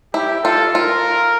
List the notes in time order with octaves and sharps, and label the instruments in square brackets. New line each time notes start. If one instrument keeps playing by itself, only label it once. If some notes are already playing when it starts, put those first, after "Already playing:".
[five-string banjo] E4 [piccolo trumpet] G4
[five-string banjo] F4 [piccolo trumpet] A4
[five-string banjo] F4 [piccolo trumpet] A#4